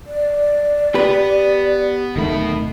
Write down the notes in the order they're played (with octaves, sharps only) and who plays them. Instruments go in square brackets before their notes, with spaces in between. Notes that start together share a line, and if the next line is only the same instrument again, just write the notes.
[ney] D5
[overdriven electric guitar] B3 [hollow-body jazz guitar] G4 B4
[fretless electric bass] D1 D#3 A3 [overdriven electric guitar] B2 B5